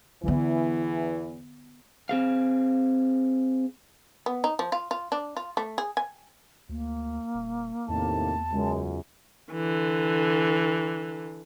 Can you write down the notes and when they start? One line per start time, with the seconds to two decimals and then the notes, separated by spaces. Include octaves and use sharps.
0.24 E2 D3 E3 B3
2.09 C4 G#4 F5
4.26 B3
4.44 D#4
4.59 F3
4.72 F4
4.91 F4
5.12 D4
5.37 F4
5.57 A3
5.78 G#4
5.97 G#5
6.69 D2 A#3
7.34 D#1
7.88 E2 A2 C3 D#3 A5
8.52 C#2 F#2 G#3
9.52 D3 E3